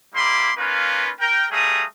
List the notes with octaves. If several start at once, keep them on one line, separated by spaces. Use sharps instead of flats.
G3 A#3 E4 B5 C6 D6
A#3 C#4 D#4 F4 B4
A#4 G5
G3 A3 G#4 F5 A#5 D#6